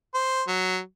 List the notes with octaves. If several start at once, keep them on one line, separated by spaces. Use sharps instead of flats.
C5
F#3